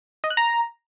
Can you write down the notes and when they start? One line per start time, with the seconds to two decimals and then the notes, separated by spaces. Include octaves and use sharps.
0.24 D#5
0.30 F#6
0.37 A#5